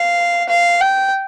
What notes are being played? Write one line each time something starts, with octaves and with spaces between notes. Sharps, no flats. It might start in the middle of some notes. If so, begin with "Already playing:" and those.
Already playing: F5
F5
G5